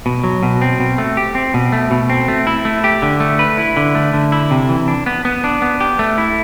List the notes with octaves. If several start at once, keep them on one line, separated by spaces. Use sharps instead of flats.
B2
F#3
B2
C4
B2
A3
G4
C4
B2
A3
B2
C4
A3
E4
A3
G4
D3
A3
B4
E4
D3
A3
D3
E4
C3
E3
D4
B3
B3
D4
B3
G4
A3
E4